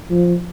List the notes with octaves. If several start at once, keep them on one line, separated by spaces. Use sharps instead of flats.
F3